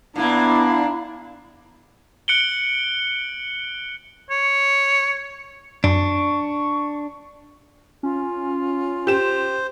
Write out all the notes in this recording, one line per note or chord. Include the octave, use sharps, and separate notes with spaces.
A#2 A#3 B3 D4 E4
F#6 C#7 D7 F#7 G7
C#5
F#2 D4 C#6
C#4 F4
G4 C5 E7